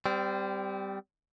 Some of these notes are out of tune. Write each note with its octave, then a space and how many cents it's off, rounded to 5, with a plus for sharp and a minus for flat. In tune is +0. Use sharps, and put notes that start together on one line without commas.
G3 +0 C4 -30